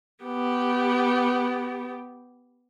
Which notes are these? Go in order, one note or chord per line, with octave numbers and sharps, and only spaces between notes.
B3 G4